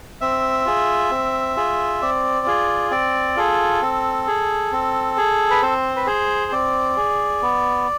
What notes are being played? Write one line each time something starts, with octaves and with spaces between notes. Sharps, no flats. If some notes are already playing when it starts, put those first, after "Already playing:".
C4 E5
F4 G#4
C4
F4 G#4
C4 D5
F4 G#4
C4 D5
F4 G#4 A4
C4
G#4
C4
G#4
B4
C4 C5
B4
G#4 C5
C4 D5
G#4
B3